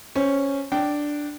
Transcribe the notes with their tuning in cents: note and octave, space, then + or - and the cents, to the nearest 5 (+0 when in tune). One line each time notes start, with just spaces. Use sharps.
C#4 +0 C5 +0
D4 +0 D5 +0 G5 -20